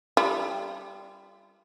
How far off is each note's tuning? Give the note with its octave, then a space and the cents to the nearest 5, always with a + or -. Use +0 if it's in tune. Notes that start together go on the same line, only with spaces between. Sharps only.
G3 +0 F4 -35